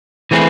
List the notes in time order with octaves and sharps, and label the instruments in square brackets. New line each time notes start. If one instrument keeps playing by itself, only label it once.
[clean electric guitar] E3 A3 C4 G#4 B4